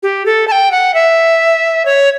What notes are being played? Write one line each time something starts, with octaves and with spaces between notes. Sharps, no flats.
G4
A4
A5
G5
F#5
E5
C#5